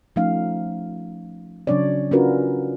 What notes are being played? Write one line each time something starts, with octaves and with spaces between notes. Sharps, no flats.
F3 A3 C#4 D#4 F5
C#3 F#3 C#4 D4 C#5 D5
C#4 D4 F4 F#4 A#4 B4